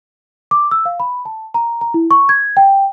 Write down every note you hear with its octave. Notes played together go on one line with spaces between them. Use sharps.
D6
E6
F5
B5
A5
A#5
A#5
E4
C#6
G#6
G5